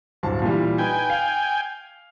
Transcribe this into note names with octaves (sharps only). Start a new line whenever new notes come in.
D1 G2 A5
A#2 E3 G3
D#4 B4 G5 G#5
F5